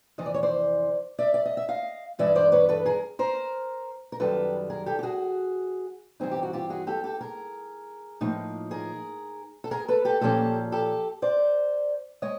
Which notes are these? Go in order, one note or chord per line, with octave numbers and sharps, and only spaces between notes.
F2 C3 E3 D#5
D5
C#5
C5 D5
D5 E5
D5
D#5
E5
D#5 F5
G2 E3 G#3 D5 E5
C5 D5
B4 C#5
A4 B4
G#4 A#4
A#4 C5
A#4
F#2 D#3 G3 A4 B4
G#4 A#4
G4 A4
G4
F#4 G#4
G2 E3 G3 C4 D#4 G#4
G4
F#4
F4 G4
F#4 G#4
G4 A4
G4 A4
G#4 A#4
A2 F3 A#3 D#4
G#4 A#4
A4
G#4 A#4
A4 B4
G4 A4
A#2 F3 A#3 C#4 G4 A4
G4 A4
C5 D5
G#3 C#5 D#5